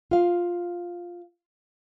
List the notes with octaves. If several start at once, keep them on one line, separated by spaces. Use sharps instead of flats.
F4 F5